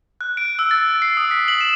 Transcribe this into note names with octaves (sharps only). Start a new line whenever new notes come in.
F#6
D7
E6
A6
C7
D#6
B6
F#7
E7